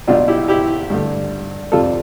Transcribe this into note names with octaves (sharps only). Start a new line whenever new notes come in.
B1 B2 G3 D4 F4
E4 G4
E4 G4
G2 D3 A3
F2 C3 G3 F4 A4